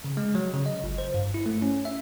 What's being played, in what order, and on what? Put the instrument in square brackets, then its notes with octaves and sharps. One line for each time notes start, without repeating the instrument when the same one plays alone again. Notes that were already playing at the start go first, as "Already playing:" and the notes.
[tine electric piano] C#3
G#3
F#3
C#3
D#5
G1
C5
G2
E4
A3
C#4
E5